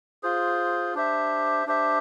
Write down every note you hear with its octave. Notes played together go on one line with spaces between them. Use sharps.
F4 G#4 C5
D4 G4 C5 E5
D4 G4 C5 E5